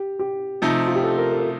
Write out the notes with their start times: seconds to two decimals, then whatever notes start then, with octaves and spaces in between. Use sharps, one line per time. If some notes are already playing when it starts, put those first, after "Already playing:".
Already playing: G4
0.19 G4
0.62 C3 F3 A3 D#4
0.87 F4
0.95 G4
1.04 A4
1.18 A#4
1.31 A4
1.39 A#4